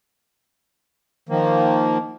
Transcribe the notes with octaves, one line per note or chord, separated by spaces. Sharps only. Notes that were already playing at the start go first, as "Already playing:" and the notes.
D#3 F3 A#3